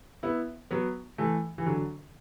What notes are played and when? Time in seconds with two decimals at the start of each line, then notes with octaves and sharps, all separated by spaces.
0.23 B3 E4
0.71 F#3 B3
1.18 E3 A3
1.58 E3
1.66 D3 F#3